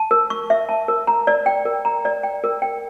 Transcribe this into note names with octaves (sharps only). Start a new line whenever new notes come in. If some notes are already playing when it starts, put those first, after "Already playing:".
Already playing: A5
A#4
C#6
E5
A5
A#4
A#5
D5
G5
A#4
A#5
D5
G5
A#4
G5